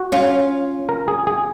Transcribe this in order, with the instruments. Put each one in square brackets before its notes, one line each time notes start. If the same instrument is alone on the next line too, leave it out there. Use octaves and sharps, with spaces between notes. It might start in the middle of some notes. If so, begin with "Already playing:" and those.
Already playing: [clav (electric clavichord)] F#4
[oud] C#4 F4
[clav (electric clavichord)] A#4
G#4
G#4